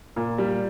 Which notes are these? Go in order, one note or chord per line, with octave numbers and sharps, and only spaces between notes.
A#2
G3